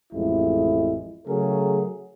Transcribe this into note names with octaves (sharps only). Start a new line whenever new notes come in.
A1 F2 G#3 E4
C#3 F#3 A3 G#4 A#4